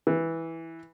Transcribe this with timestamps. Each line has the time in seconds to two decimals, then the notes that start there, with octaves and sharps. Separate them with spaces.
0.07 E3